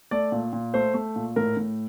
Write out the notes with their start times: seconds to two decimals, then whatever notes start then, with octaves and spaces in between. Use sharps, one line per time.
0.11 A3 D5
0.32 A#2
0.53 A#2
0.74 A3 C5
0.94 A3
1.16 A#2
1.36 A2 A#4
1.57 A2